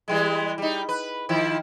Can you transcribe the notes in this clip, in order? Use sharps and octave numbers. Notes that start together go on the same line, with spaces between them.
E3 G3 G#3
G3 D#4
B4
D#3 F3 E4